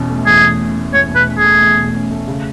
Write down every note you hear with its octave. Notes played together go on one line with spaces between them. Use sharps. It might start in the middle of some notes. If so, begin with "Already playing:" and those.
Already playing: E2 B2 C#4
A3
E2 G#4
B2
C#4
A3
E2 C#5
B2
B4
C#4
G#4
A3
E2
B2
C#4
A3
C#3